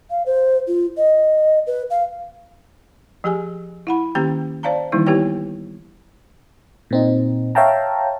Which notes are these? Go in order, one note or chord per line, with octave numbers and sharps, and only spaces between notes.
F5
C5
F4
D#5
B4
F5
F3 G4 G#4 G#5
E4 F#5 B5
D#3 A#3 C#4 G4 G5 A#5
C5 D5 F5 A5 A#5
D#3 E3 G3 A#3 D#4 E4
B3 E4 G4 B4 C#5 G5
A#2 C4 D#4
C#5 E5 F5 G5 A5 A#5